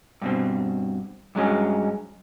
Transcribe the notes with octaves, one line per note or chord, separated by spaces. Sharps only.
G2 B2 C4
G2 F#3 G#3 C#4